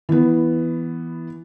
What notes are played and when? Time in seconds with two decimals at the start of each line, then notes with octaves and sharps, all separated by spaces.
0.09 E3 B3